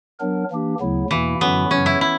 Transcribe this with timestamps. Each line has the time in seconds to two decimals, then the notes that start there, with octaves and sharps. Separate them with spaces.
0.20 F#3 B3 D4 A#4
0.51 E3 A#3 D4 G4
0.80 D2 C#3 F#3 B3 E4
1.10 E2 B2 E3 A#3 E4
1.41 F#2 D3 F#3 B3 C#4 F#4
1.71 F#2 C#3 F#3 C#4
1.86 E4
2.01 E4